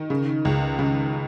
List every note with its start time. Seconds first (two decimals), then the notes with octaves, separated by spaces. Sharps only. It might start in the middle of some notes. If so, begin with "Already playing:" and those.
Already playing: D#3
0.10 C#3
0.45 C#2
0.79 C#3